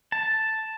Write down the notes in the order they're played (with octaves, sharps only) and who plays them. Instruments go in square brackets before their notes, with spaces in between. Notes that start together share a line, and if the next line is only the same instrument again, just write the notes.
[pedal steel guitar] A5